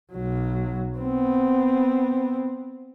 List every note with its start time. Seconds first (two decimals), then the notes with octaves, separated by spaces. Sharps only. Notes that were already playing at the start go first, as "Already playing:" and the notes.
0.12 B1 F#3
0.98 B3 C4